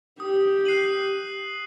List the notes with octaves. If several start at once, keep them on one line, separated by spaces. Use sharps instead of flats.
G4 D#6
F#6 C7 D#7 F#7